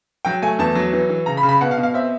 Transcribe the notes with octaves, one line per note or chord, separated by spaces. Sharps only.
F#3 G5
A3 G#5
E2 A5
F#3
E3
E3
C#3 A#5
B5
C#3
B5
B2 F#5
F5
B2
F5
C4 E5